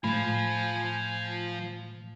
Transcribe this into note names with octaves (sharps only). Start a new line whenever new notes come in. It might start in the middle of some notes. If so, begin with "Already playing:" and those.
A2 F3 A3 F4 G#5 B5